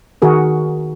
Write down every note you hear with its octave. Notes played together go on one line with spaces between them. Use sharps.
D#3 F#4 G#4 A#4